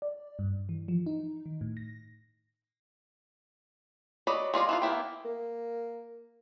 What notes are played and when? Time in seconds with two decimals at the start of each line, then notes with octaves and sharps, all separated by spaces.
0.02 D5
0.39 G2
0.69 E3
0.88 F3
1.06 D#4
1.46 D#3
1.61 A2
1.77 A#6
4.27 F#3 D5 D#5 B5
4.54 G#3 F4 D5 D#5
4.69 E3 D#4 F4
4.82 A#3 B3 E4 G5
5.25 A#3